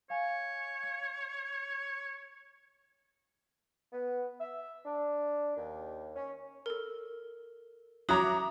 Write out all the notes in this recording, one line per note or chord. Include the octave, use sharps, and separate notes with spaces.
C#5 F5 G#5
G#6 C#7
B3
E5
D4
D#2
C#4
A4 A#4
F#3 E5 A#5 D6 D#6